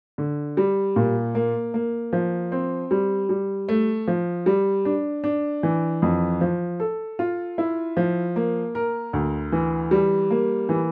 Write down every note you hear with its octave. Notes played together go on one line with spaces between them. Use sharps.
D3
G3
A#2
A#3
A#3
F3
C4
G3
G3
A3
F3
G3
D4
D4
E3
F2
F3
A4
F4
E4
F3
A#3
A#4
D2
E3
G3
A#3
E3